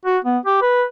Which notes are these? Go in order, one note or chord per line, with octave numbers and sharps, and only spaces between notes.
F#4
B3
G4
B4